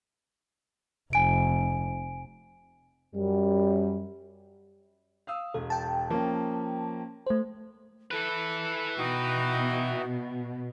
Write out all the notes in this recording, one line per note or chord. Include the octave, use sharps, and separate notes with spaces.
F1 G#5 D7
F#2 G3
F5 D#6 E6
E1 A4
G5 A5
F3 A#3 C#4
A3 C5
E4 A4 B4
B2 D#4 F#4 G5